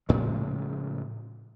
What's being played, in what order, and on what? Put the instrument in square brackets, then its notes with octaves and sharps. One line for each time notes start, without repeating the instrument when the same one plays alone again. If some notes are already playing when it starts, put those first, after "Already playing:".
[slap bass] A2 C#3 F3 G#3